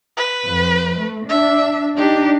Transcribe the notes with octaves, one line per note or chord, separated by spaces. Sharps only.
B4
F2
A3
D4 E5
D4 D#4 G4